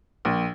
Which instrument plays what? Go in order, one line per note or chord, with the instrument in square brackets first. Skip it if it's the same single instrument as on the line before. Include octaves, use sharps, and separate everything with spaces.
[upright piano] A#1